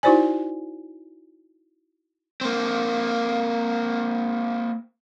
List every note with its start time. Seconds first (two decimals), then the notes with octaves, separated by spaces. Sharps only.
0.03 D#4 E4 F#4 C5 D5 G#5
2.41 A#3 C4